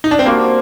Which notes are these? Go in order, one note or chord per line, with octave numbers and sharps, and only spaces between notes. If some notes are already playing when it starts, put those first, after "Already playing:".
D#4
D4
C4
G3 A#3 D4 F#4 C5